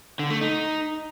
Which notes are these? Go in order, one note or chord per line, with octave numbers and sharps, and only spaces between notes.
D3
A3
D#4